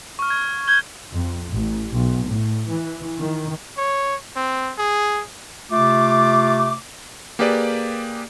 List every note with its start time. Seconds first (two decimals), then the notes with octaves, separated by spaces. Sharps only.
0.19 C#6 F6
0.30 G#6
0.68 C#6 G6 G#6 G7
1.12 F2
1.50 A1
1.93 B1
2.26 A2
2.69 E3
3.18 D#3
3.77 C#5
4.36 C4
4.78 G#4
5.71 C3 A3 F4 D6
7.39 A#3 G4 G#4 B4 D5